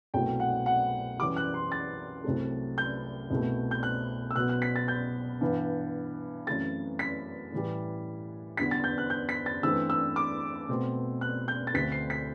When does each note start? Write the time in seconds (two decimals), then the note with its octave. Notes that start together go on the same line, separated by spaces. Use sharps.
0.14 C2 B2 F#3 A3 C4 G5
0.40 F#5
0.66 F#5
1.18 F#2 E3 G3 D6
1.36 F#6
1.54 C6
1.72 A6
2.24 C2 C3 F#3 A3
2.78 G6
3.31 C2 B2 A3
3.71 G6
3.83 F#6
4.31 E6
4.36 B2 F#3 B3 F#6
4.49 F#6
4.62 B6
4.76 A6
4.88 G6
5.41 G2 E3 B3
6.46 F#2 E3 A3 C4 A6
6.99 B6
7.52 A2 E3 G3
8.57 E2 D3 G3 B3 B6
8.71 A6
8.84 G6
8.98 F#6
9.10 G6
9.29 B6
9.46 A6
9.63 G2 E3 A3 C4 E6
9.90 E6
10.16 D6
10.69 B2 A3 C4
11.21 F#6
11.48 G6
11.67 A6
11.74 D2 D3 A3 C4 B6
11.92 C7
12.10 B6